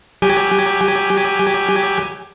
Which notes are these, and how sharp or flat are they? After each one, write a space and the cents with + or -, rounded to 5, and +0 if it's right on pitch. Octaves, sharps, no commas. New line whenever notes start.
F#3 +25 G4 +10 G#5 +0